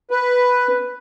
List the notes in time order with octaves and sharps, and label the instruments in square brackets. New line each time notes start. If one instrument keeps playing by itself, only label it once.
[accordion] B4